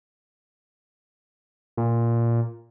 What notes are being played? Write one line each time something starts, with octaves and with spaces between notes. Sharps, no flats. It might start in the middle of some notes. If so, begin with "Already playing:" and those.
A#2